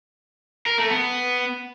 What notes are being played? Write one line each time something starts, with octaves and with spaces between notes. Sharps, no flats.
A#4
A3
B3